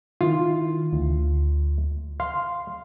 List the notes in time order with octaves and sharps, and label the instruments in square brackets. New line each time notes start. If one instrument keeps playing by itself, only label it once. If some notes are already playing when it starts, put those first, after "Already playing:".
[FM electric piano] D#3 E4 [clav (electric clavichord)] F4
[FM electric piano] D2
[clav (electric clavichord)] F5 [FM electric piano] C6